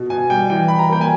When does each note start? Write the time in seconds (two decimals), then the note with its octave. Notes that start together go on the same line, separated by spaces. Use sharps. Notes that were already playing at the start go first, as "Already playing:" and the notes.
Already playing: B2
0.10 B2 G#5
0.30 G3 G5
0.50 E3 G5
0.68 E3 B5
0.79 A#5
0.89 A#3 G5
1.01 G#5